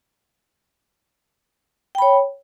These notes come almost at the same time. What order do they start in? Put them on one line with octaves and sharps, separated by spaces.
G5 B5 C#5